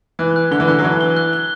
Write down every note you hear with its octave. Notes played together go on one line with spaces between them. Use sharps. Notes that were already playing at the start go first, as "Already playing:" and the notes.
E3 F#6
F#6
D3 G7
E3
D3 F#6
F#3
E3 F#6
G7
F#6
G7